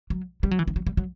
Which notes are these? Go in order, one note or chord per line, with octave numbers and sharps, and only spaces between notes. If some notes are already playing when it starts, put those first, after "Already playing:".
F#3
G3
F#3
E3
D#3
F#3
G3
F#3